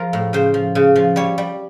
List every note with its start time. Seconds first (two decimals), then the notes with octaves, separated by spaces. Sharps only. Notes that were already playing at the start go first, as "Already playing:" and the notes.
Already playing: F3 A#4
0.13 A2
0.33 C#3 C5
0.54 F3
0.75 C#3
0.96 F3
1.16 G3 C#5
1.38 G3